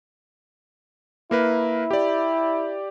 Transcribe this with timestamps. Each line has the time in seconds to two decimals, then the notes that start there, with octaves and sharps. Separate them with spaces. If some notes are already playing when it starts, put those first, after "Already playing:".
1.31 A#3 E4 A#4 B4
1.91 G4 D5